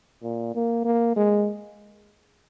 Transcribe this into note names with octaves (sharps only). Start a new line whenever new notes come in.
A#2
A#3
A#3
G#3